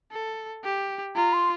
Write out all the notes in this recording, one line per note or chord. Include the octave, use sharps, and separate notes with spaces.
A4
G4
F4 A#5
C6